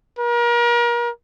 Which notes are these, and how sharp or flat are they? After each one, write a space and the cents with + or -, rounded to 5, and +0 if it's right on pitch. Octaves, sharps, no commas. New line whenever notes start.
A#4 +35